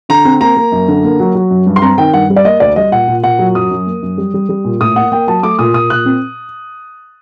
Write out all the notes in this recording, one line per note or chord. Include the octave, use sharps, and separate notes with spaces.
D3 A#5
C4
A#3 A#5
A#3
F#2
D3
A#3
F#3
F#3
F#2
G2
C6
C4 A#5
D#3 G5
G2 F#5
G3
D5
A#3 D#5
D2 D5
G3 D#5
A#2 F#5
A#2
A#2 F#5
F#3
F#2 D#6
F#2
A#3
F#2
G3
G3
G3
A#2
A2 D#6
A#3 F#5
A#3 G5
F#3 A5
A3 D6
A#2 D#6
A#2 D#6
A#2 F#6
C4